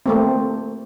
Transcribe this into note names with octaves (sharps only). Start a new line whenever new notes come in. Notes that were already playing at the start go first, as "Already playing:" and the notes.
A3 A#3 C4